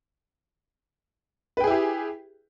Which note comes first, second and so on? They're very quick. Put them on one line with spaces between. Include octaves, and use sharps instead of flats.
B4 G5 G#4 E4 G4